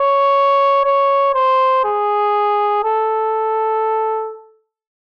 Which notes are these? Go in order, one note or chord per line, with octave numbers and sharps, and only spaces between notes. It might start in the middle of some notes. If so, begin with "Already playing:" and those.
Already playing: C#5
C#5
C5
G#4
A4